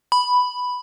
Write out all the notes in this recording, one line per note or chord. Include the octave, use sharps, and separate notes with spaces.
B5